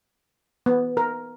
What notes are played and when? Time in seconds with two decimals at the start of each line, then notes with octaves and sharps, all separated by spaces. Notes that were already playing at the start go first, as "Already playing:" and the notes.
0.66 B3
0.97 A#4